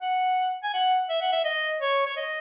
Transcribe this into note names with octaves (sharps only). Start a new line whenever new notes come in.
F#5
G#5
F#5
E5
F#5
E5
D#5
C#5
C#5
D#5